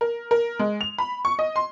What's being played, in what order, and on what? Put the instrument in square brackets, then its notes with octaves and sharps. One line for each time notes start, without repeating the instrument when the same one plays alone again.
[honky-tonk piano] A#4
A#4
G#3
F7
B5
C#6
D#5
C6